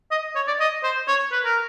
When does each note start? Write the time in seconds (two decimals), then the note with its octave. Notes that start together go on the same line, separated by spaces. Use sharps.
0.11 D#5
0.35 C#5
0.47 D5
0.60 D#5
0.83 C5
1.08 C#5
1.32 B4
1.44 A#4